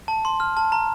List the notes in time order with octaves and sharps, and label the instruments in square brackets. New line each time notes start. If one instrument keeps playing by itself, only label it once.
[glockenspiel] A5
C6
F6
A5
A#5